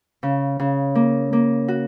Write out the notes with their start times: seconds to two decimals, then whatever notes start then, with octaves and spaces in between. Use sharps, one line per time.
0.23 C#3
0.59 C#3
0.95 A#3
1.33 A#3
1.68 F#4